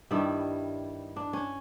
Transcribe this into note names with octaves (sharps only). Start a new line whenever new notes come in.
G2 D#3 G3 E4
D4
C#4